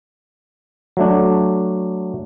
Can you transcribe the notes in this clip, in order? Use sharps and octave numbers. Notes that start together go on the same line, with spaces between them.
F#3 A3 D4